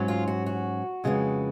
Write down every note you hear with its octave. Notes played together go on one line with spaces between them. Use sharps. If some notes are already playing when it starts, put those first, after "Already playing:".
Already playing: G#2 F#3 C#4
F4
F#4
F#4
F2 C#3 G#3 B3